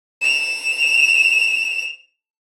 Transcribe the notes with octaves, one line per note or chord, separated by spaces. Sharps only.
E7 F7